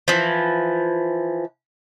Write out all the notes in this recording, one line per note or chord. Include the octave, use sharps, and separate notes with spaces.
E3 F3